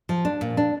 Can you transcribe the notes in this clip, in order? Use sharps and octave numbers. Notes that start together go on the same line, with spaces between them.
F3
D4
A#2
D4